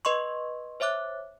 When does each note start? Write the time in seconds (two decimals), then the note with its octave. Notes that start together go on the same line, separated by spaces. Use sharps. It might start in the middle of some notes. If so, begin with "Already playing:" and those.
0.05 B4 D#5 C6 C#6
0.80 C5 C#5 E5 D6 F#6